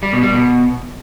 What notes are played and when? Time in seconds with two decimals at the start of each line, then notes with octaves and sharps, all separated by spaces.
0.03 G3
0.13 B2
0.23 G3
0.33 B2